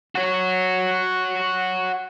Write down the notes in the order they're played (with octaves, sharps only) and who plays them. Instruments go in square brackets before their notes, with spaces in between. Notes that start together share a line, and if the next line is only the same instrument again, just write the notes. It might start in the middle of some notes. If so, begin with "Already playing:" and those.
[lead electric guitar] F#4 C#5